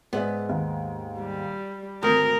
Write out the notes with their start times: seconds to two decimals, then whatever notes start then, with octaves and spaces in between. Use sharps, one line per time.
0.13 G#2 B3 G#4 D5 E5
0.49 D#2
1.18 G3
2.03 G#1 D2 A#4 D#6 G6